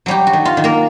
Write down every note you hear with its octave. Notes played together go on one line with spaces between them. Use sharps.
F#3 G3 G4
F#4
D#3
F4
D#3
A#3 A#4